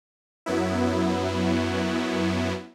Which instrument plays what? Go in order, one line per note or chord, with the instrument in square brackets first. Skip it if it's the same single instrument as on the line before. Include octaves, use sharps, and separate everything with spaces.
[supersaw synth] F#2 F#3 B3 E4